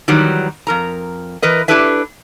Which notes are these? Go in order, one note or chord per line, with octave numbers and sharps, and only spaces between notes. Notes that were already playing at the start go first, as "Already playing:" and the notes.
D#3 E3 F#3 G3
F2 A#4 A#5
E3 A#4 B4 D#5
D4 E4 G4 A4 B4 E5